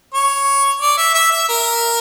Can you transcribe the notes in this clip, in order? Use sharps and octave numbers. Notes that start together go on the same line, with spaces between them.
C#5
D5
E5
E5
E5
A#4